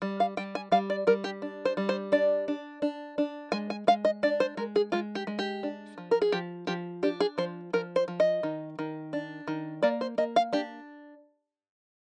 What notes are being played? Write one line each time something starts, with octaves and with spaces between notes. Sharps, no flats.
G3
F5
G3 G5
G#5
G3 F5
D5
G3 A#4
G4
D4
C5
G3
C5
D4 D5
D4
D4
D4
G#3 G#5
G#5
G#3 F5
D#5
D4 D5
C5
G#3 A#4
G#4
G#3 F4
G4
G#3
G4
D4
F3
A#4
G#4
F3 G4
F3 G4
D4 G4
G#4
F3 C5
F3 A#4
C5
F3
D#5
D#3
D#3
D4
D#3
A#3 D5
C5
A#3 D#5
F5
D4 G4